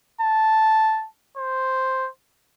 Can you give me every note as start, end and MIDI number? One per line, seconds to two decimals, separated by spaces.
0.21 1.07 81
1.37 2.09 72